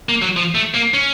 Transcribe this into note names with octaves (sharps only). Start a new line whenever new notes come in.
A#3
F#3
F3
A3
A#3
C#4